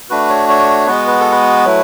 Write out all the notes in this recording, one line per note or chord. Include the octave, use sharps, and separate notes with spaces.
A3 D4 F#4 B4
C#5
C#5
G#3 B3 F#4 B4
B4
A4
B4
F#3 A3 E4